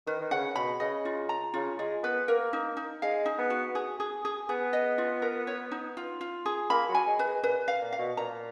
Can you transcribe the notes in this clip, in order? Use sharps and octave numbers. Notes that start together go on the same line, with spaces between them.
D#3 B4
D#3
C#3 F#5
B2 B5
C#3 D#5
F4
A#5
C#3 F4
G#3 F4
B3 B4
A#3 A#4
D#4
D#4
G#3 F5
D#4
B3
F#4
G#4
G#4
G#4
B3 G#4
D#5
F4
A#4
C#5
D#4
F4
F4
G#4
A#3 B5
F#3
G#5
G#3
B4
G#3
A#2 B4
F5
A#2
F5
B2
A#2 A#5